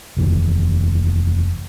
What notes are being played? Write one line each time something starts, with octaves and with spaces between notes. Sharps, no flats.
F1 D#2 E3